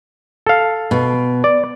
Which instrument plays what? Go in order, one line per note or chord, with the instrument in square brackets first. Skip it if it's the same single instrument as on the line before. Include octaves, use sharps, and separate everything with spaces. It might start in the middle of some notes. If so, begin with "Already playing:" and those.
[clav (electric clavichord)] A4 F5
[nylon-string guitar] B2
[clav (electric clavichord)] D5